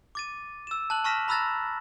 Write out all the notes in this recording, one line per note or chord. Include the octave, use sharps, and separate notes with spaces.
D6 A6 D#7
E6 E7
A5 F#6 F#7
A5 C#6 F6 A#6 B6 E7
A#5 B5 E6 F#6 A6 A#6